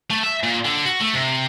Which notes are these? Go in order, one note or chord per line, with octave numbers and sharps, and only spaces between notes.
A3
E5
A#2
D3
F#4
A3
C3